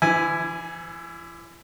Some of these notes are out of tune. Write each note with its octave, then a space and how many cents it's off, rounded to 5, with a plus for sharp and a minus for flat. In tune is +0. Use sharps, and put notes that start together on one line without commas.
E3 +40 E4 -5 G#5 +0